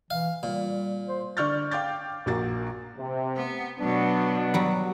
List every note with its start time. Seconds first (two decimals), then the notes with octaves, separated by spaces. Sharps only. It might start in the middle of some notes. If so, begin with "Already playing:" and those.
0.10 E3 F5
0.43 A#2 G3
1.08 C5
1.37 D3 D5 C#6 F6 G6 A6
1.71 F5 G5 D6 G6 A6
2.26 A#1 A#3 F#4 A6
2.98 C3
3.36 B3
3.79 B2 F#3 B3 D4
4.54 F#3 G3